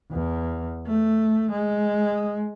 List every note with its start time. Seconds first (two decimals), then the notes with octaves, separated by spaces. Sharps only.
0.11 E2
0.86 A3
1.51 G#3